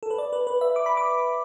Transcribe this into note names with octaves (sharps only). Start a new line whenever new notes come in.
A4
B4
D5
B4
B4
E5
D6
B5
D6